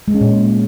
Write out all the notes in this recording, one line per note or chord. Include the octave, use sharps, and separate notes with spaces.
G#3
C#4
A#2